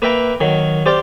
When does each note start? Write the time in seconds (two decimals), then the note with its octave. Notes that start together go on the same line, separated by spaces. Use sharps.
0.02 A#3 B4 E5 G5 A#5
0.41 D#3 F#3
0.86 G4 C5 D5 F5 G5